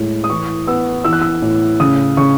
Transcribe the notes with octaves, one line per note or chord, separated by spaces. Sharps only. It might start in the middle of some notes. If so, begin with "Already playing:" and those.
Already playing: A2 G#3
D#6
E3 C#6
B3 E6
E3 E6
F#6
E6
A2
C#3 D#6
C#3 C#6